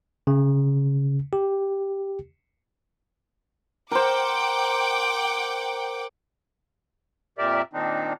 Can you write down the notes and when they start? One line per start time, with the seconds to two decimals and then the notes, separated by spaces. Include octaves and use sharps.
0.27 C#3
1.33 G4
3.92 A#4 C5 F#5 G5 D6
7.38 F2 A#2 G4 A#4 D5 E5
7.73 A#2 D#3 C4 D4 D#4